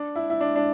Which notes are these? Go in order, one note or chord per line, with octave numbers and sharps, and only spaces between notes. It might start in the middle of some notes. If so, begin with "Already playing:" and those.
Already playing: D4
E4
E4
D4
D4